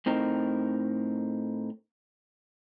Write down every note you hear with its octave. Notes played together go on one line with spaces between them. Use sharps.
A2 C4 D#4 A#4